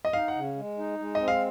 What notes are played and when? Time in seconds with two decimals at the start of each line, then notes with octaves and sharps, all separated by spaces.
0.05 D#5
0.13 D#4 F5
0.28 F#5
0.35 C#3
0.56 G#3
0.78 D#4
0.99 G#3
1.15 C4 D#5
1.28 F5